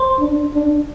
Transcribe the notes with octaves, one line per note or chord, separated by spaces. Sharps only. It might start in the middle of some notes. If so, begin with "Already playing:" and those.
Already playing: C5 C6
D4
D4